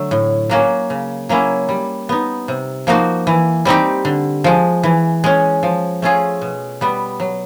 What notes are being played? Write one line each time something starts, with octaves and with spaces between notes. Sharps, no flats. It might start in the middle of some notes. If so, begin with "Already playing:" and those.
Already playing: D3 F#3 A3
A2
F#3 A#3 C#4 F#4
C#3
F#3 A#3 C#4 E4
G3
B3 D#4
C3
F3 A#3 D#4 F#4
E3
G3 C4 D#4 G4
D3
F3 G#3
E3
G#3 C#4
F3
A3 C#4 F4 G#4
B2
G3 B3
F#3